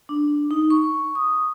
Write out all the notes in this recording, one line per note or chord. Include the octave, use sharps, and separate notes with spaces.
D4
D#4
C#6
D#6